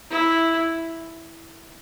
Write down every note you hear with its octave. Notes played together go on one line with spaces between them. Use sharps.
E4